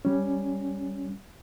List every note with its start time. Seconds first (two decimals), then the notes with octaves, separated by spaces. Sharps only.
0.05 G3 C#4